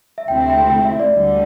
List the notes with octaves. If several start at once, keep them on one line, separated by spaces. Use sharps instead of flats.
E5
D2 C3 A3 C4 E4 G5
E5
G5
G5
E5
D5
D2 D3 G3